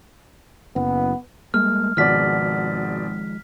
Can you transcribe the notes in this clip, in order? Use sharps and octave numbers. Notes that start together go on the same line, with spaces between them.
F#1 B3
G3 G#3 A#3 F6
G#1 B2 D#3 F3 G#3 D5 F6 B6